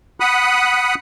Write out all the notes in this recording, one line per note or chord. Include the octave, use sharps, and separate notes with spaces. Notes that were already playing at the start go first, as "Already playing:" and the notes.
F#5 B5 D#6 F#6